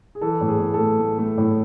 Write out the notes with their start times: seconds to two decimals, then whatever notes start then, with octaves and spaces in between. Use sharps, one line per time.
0.15 G#4
0.21 E3 A4
0.41 A2
0.48 G#4
0.60 A2
0.74 A4
0.79 A3
1.00 A3
1.18 A3
1.38 A2